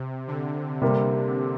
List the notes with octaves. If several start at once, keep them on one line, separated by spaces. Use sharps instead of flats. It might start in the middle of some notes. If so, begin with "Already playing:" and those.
Already playing: C3
D3
C3 G3 A#3